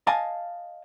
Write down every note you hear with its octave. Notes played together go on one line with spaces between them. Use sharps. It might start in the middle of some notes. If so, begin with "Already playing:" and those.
D#5 F5 G#5 A5